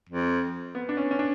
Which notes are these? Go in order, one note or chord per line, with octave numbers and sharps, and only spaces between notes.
F2
B3
D4
C#4
C#4
D4